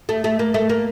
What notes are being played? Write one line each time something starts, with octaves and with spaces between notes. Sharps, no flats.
A3
A3
A#3
A3
A#3